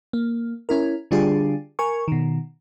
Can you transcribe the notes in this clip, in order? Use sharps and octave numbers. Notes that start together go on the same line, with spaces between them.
A#3
C#4 E4 A#4
D3 G3 D4 F4 G4 G#4
A#4 G#5 C#6
B2 D#3